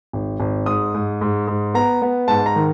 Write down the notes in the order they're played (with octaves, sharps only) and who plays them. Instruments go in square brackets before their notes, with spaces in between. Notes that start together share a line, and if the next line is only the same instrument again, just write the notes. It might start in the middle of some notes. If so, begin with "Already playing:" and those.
[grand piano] G#1
G#1
G#2 D#6
G#2
G#2
G#2
B3 A#5
B3
G#2 A5
A#5
D#3